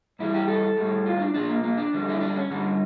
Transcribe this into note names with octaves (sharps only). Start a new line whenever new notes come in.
G2 E3 G3 E4
G4
A4
A2 G3
F4
D4
A#2 F3 D4
A#3
A#3
D4
F2 D3 G3
E4
D4
C#4
G2 D3 G3